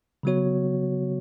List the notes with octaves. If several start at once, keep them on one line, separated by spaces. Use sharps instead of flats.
C#3 F#3 B3 F#4 C#5